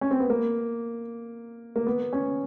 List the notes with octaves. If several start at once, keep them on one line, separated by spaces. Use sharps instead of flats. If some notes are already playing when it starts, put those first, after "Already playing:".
C#4
C4
B3
A#3
A#3
B3
C#4